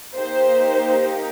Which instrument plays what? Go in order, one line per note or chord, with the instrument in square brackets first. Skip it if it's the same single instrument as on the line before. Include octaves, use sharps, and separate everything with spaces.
[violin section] A#3 D#4 G4 C5